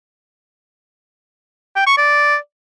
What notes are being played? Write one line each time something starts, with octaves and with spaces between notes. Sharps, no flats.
G5
C#6
D5